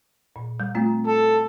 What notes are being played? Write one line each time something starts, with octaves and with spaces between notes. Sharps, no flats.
A#2
G3
A3 C4 F4
A4